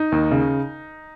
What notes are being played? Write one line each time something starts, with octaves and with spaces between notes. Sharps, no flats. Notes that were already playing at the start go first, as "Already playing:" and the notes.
Already playing: D#4
D#2
C#3